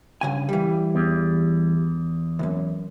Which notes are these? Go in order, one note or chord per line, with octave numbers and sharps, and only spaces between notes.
G2 C#3 G#5
E3 G3
E2
C2 F#2